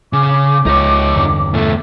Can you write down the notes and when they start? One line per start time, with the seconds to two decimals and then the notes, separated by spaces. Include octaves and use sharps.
0.13 C#3 D6
0.66 C#2 D#4 C#5
1.16 E2 G2 D3
1.54 B2 A3